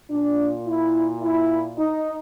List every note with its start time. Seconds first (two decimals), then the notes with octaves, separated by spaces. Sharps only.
0.10 A#2 D4
0.67 E4
1.21 E4
1.78 D#4